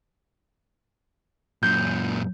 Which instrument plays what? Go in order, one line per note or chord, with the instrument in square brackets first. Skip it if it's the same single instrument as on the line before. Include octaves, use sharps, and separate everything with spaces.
[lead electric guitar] F#2 A#2 [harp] G6